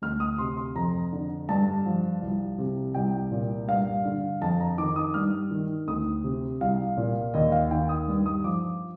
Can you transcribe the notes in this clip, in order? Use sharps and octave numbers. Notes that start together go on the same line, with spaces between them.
D2 F6
D#6
C3 C6
C6
F2 A#5
D3
G2 A5
F3
C2
C3
C2 G5
A#2
G2 F5
D3
F2 A5
A#5
D#3 D6
D#6
G2 F6
D#3
D2 D#6
C3
C2 F5
A#2
D#2 D#5
F5
D#3 G5
D#6
G2
D#6
F3 D6